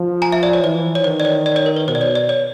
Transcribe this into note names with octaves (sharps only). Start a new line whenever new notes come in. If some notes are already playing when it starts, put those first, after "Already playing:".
Already playing: F3
G#5 A#5
E5
D5
C#5
E3 C5
C#5
D#3 C5
D5
C#5
D5
C#5
A#4
B4
B2 C5
D5
C#5
D5
C#5